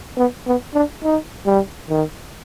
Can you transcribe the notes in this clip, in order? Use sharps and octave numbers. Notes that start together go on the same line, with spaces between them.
B3
B3
D4
D#4
G3
D#3